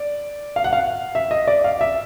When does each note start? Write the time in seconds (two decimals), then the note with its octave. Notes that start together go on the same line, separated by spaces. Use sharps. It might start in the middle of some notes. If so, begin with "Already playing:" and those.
Already playing: D5
0.56 F5
0.64 F#5
0.73 F5
1.15 E5
1.31 D#5
1.47 D5
1.64 F5
1.81 E5